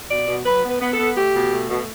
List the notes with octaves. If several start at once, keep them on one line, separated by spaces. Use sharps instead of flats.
B2 D5
B2
F#3 B4
B3
B4
B3
A4
B3
A3 G4
B2
A3
B2